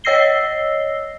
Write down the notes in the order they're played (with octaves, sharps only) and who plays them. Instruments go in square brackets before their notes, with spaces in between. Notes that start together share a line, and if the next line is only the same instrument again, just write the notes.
[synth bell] C#5 D#5 E6 A#6 C7 G7